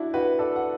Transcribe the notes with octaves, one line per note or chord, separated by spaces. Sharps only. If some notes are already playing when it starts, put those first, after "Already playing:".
Already playing: D4 E4 F#4
F#4 B4
A4 D5
F#5